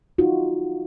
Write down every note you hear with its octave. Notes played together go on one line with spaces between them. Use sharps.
D#4 F4 F#4